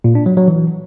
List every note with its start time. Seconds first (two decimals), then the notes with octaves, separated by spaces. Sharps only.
0.04 A#2
0.15 D4
0.26 F#3
0.37 F#3
0.48 E3